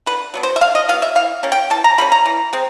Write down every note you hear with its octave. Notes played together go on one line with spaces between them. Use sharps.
D3 B4
F#3 B3 D4
C5
E5
D3 F5
D#5
F#3 B3 F5
E5
E3 F5
G3 A#3 C#4
G5
E3 A5
A#5
G3 A#3 C#4 B5
A#5
E3
G#3 C4